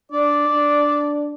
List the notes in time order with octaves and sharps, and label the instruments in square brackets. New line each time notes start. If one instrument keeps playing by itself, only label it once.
[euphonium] D4 [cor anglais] D5
[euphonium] D4